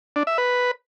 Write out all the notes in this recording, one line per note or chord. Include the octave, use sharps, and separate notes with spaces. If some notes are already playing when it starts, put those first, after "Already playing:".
D4
E5
B4